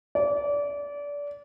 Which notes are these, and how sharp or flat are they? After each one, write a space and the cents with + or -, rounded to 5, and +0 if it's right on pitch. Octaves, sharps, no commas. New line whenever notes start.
D5 -25